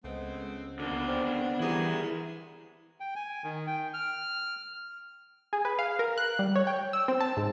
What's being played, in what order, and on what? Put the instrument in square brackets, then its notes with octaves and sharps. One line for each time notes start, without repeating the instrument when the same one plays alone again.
[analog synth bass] C#2 [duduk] G#3 [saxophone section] A3 B3 C4
[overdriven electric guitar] D2 A#3 [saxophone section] C#3 D4 [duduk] B3
[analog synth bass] C4
[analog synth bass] E3 [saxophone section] G3 G#4 [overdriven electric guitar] E4 A#4
[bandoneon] G5
G#5
D#3
G5
F6
[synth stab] G#4
B4
F5
A#4
F#6
G3
C#5
G5
E6
C4
A5
G#2